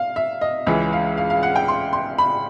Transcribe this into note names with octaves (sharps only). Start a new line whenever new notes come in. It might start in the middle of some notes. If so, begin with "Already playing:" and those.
Already playing: F5
E5
D#5
C#2 C#3 E3 G#3 E5
F5
F5
F5
F#5
G5
C6
C6
B5